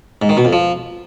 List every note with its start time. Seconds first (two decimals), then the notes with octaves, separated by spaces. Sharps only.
0.22 G#2
0.29 D#3
0.37 B2
0.45 F2
0.53 F3